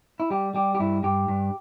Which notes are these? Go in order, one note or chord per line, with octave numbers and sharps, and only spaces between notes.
E4
G3 G4
G3 G4
G4
G2 E4
G2 G4
G2